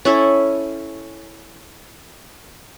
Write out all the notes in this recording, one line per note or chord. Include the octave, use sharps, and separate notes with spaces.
C#4 E4 A4 C#5